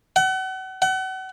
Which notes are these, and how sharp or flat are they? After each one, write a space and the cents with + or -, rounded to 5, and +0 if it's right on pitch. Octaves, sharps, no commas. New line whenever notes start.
F#5 +35
F#5 +35